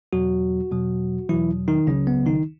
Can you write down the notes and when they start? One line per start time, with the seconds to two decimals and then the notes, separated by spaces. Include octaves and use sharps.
0.13 E2 B2 F#3 F#4
0.71 E2 B2 F#3
1.29 E2 B2 E3 F#3 E4
1.68 D#3 D#4
1.87 C#2 C#3 F#3 C#4
2.07 B3
2.26 D#3 D#4